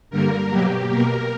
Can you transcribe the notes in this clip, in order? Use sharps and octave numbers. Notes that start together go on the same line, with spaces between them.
G2 D3 G3 A#3 A#4
B2 F#3 A#3 G4
B2 A#3 A#4